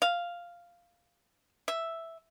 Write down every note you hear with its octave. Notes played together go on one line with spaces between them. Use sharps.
F5
E5